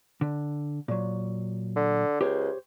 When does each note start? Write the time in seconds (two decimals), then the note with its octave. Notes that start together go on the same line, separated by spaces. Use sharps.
0.21 D3
0.88 A#2 F#3
1.76 D3
2.21 C#2 G4 C5 C#5